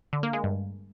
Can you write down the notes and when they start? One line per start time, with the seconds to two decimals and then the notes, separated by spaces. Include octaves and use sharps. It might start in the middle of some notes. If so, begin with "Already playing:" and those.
0.13 D3
0.23 A#3
0.33 G#3
0.44 G2